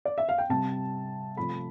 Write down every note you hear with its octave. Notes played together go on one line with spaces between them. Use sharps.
D5
E5
F5
G5
C3 G3 A5
C3 F3 A3 B5